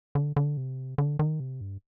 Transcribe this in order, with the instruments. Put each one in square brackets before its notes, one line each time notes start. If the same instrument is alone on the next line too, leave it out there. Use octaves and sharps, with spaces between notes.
[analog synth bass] D3
D3
C3
D3
D#3
C3
G2